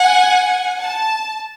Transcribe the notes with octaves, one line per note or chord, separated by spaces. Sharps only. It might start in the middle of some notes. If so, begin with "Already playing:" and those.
Already playing: F#5 G#5
A5